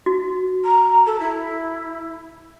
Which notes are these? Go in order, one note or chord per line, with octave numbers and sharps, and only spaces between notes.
F#4
A#5
A4
E4